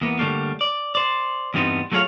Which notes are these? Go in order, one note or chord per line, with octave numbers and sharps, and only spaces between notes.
E2 A#3 B3
D3 G3 A3 A#3
D5
C5 D5
E2 G2 G3 B3 C4 D#4
F#3 A3 F4 G#4 C#5 F5